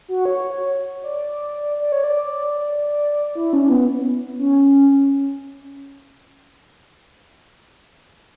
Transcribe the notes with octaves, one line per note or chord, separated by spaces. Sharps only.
F#4
C#5
D5
D5
C#5
D5
E4
C#4
B3
C#4